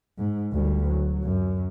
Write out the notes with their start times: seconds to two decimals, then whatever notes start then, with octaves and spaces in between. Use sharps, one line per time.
0.18 G#2
0.52 D2 G3
0.88 F#3
1.23 F#2